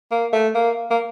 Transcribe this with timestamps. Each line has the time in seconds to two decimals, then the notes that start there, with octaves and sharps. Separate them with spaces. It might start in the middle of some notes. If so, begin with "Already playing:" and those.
0.11 A#3
0.33 A3
0.55 A#3
0.91 A#3